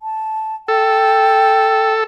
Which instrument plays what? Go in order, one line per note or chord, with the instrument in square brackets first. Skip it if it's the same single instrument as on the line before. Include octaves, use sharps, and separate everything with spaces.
[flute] A5
[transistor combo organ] A4 [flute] G5